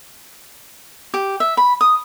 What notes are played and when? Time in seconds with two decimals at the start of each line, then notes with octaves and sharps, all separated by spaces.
1.14 G4
1.40 E5
1.57 B5
1.81 D#6